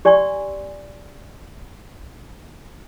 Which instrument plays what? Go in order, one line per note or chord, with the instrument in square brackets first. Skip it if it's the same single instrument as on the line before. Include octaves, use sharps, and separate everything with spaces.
[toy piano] G4 D5 G#5 C6 C#6